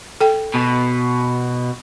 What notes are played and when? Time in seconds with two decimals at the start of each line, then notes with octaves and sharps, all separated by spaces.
0.21 A4 G5
0.55 B2